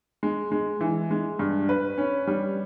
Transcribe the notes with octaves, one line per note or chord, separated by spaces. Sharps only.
G#3
G#3
E3
G#3
G2
B4
C#4
G3